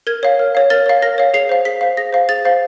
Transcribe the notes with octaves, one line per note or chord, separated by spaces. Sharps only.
A#4 G#6
C#5 F5
A#4
C#5 F5
A#4 A6
C#5 F5
A#4 A#6
C#5 F5
G#4 C7
C5 F5
G#4 B6
C5 F5
G#4 A#6
C5 F5
G#4 A6
C5 F5